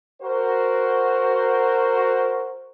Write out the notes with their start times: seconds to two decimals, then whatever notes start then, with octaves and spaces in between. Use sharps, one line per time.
0.21 F#4 A#4 C5